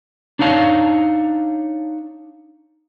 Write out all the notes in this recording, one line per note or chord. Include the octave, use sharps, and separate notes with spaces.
D4 D#4 C#5 F5 A5